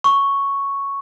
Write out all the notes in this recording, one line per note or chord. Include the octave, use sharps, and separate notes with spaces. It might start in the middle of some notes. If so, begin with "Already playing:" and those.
C#6